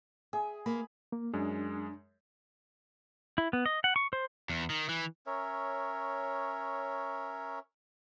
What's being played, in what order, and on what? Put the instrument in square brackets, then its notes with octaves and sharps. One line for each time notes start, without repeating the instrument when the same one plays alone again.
[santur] G#4 [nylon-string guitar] E5
[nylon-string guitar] A#3 [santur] B5
[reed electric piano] A#3
[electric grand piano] F#2 G#3 [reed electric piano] D4
[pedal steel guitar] E4
B3
D#5
F#5
C#6
C5
[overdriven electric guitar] E2
D#3
E3
[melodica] C#4 A#4 C#5 E5